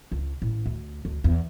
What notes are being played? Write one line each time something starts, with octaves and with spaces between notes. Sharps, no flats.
C#2
A1
D2
D2
E2